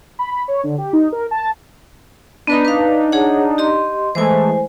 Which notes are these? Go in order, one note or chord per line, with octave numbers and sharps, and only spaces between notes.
B5
B5
C#5
D3
G4
D#4
A#4
A5
B3 D4 D#4 B4 B5
B4 F5
G#4 C#5 F#5
G4 D#5 C6
E3 G#3 A3 C5 G#5